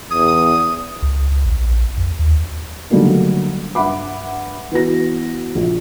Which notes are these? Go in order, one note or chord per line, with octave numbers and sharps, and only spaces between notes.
E2 D#6
C#2
A#1
F2
D#2
D3 F#3 G3 A3 A#3 D#4
G2 E5 F#5 B5 D6
E3 B3 F#4 A#6
A#1